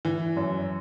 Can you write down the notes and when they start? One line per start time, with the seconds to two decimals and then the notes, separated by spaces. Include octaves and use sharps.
0.05 E3
0.37 F#2